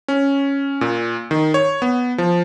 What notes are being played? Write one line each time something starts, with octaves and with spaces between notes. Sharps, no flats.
C#4
A#2
D#3
C#5
B3
F3